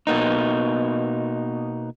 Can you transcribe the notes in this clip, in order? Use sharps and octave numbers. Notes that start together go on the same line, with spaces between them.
B2 A#3 B3 D#4